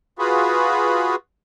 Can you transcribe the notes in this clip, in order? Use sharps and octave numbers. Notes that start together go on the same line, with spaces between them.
F4 F#4 G#4 B4